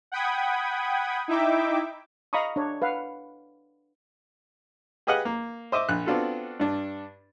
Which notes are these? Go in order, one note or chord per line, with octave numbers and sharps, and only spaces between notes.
F#5 G5 B5 D#6 G#6
D#4 E4 E5 G5 D6
D#5 F5 A#5 B5 C#6 D#6
D4 C#5
B4 F5 F#5
G4 G#4 B4 D#5 F5 F#5
A#3
C5 D#5 E5 D6
A#1 F#6
B3 C4 D4 F4 F#4 A4
G2 D4